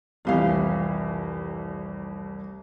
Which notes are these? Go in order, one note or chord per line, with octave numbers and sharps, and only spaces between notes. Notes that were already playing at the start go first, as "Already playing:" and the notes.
F1 C2 E3 F4 G4 F5